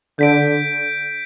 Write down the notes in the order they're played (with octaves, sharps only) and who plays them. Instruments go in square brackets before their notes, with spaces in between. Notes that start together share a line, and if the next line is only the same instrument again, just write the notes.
[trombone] D3 [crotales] G6 B6 D7